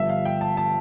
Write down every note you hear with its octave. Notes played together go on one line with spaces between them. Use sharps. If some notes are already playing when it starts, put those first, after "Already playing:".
Already playing: G1 G2 F3 E5
F5
G5
A5
A5